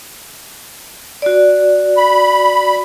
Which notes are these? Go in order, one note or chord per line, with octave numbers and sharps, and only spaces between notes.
F#4 D5
B5